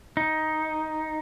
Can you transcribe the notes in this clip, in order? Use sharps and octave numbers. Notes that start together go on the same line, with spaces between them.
D#4